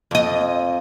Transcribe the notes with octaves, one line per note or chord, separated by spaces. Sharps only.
F2 D#5